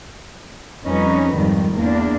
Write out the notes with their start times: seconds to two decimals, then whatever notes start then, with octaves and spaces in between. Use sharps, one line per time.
0.86 F2 G3 C#4 D#4 B4
1.36 F2 G#2 D#3 G3
1.77 E2 A#3 D4